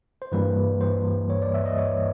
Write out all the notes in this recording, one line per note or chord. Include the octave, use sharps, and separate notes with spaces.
C5
G2 E3 G3 A#3 B4
C5
C#5
D5
E5
D#5
C#5